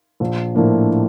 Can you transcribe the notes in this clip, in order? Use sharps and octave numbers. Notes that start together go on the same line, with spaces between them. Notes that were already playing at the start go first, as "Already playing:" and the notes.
A#1
A2 F3 A#3 D4